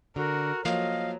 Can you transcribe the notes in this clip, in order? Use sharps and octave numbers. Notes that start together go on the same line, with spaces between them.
D3 F#4 A#4
F3 F#3 A#3 D#5 F5